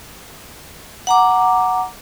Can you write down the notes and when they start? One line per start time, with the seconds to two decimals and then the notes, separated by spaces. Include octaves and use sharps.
1.07 F#5 A#5 D6